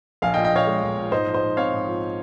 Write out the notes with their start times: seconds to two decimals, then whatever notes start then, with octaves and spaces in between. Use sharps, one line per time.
0.22 A#1 F5 G#5
0.34 D#5 G5
0.37 A#2
0.45 D#5 G5
0.52 A#1 C#5 F5
0.67 G#3
0.82 A#1
0.97 A#2
1.12 G#2 C5 D#5
1.27 F3
1.34 C5 D#5
1.42 G#2
1.57 C4 C#5 F5
1.72 G#2
1.86 F3